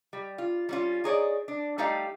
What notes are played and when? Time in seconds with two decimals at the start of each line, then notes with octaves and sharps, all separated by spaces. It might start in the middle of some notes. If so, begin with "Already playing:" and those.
0.13 G3
0.38 F4
0.69 G3 C#4 F4
1.04 D#4 G#4 C#5 D5
1.48 D4
1.78 G3 A3 D#4 G4 F5